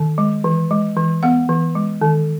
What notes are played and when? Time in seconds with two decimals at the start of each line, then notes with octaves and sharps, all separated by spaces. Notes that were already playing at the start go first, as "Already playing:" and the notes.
Already playing: D#3
0.18 G#3
0.44 E3
0.71 G#3
0.97 E3
1.23 B3 F#5
1.49 E3
1.75 G#3
2.01 D#3